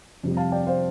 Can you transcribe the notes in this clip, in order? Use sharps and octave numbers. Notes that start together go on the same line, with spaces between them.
F2 C3 G3
F5 A5
D5 G5
C5 F5